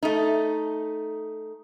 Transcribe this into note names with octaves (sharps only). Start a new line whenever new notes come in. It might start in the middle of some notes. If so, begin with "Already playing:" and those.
A3 D#4